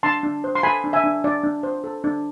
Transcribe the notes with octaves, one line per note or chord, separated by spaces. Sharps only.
D4 A5 C6
D4
C5
C6
A4 G#5 B5
D4
E5 G#5
D4
D4 D5
D4
C5
A4
D4